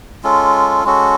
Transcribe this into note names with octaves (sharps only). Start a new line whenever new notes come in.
G#3 C#4 F4 A4
G#3 C#4 F#4 A4